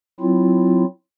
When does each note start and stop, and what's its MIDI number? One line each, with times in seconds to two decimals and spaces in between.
0.20 0.85 54
0.20 0.85 60
0.20 0.85 64
0.20 0.85 65